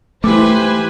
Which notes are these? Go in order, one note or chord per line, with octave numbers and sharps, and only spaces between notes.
E3 A3 G4 B4 C5 G#5 D6